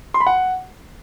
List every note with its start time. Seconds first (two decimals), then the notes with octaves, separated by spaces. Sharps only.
0.14 C6
0.20 B5
0.27 F#5